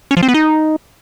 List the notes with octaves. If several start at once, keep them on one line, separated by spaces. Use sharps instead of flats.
C#4
F3
C4
B3
D#4